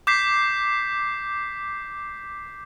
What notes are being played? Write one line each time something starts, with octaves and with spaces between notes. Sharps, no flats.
D6 G6 B6 C7